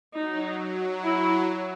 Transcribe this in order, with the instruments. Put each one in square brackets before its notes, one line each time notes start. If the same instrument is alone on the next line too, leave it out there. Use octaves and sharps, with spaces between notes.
[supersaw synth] F#3 [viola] D#4
[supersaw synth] F#3
[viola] E4